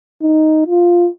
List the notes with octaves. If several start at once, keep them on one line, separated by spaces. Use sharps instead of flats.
D#4
F4